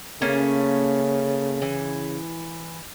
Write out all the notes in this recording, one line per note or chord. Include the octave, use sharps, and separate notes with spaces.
C#3 A3 A#3 C#4
E3